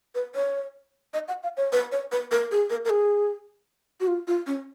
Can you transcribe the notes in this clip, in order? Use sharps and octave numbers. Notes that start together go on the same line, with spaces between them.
B4
C#5
D#5
F#5
F5
C#5
B4
C#5
B4
A#4
G#4
A#4
A#4
G#4
F#4
F4
F4
C#4